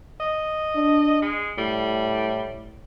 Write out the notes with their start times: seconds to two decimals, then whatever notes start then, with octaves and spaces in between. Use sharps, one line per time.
0.20 D#5
0.76 D4
1.22 G#3
1.58 A2 G3